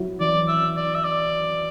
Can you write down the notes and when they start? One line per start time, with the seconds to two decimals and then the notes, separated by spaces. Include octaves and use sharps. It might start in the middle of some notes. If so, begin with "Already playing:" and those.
Already playing: F#3 E4
0.20 E3 D5
0.48 E5
0.76 D5
0.95 E5
1.04 D5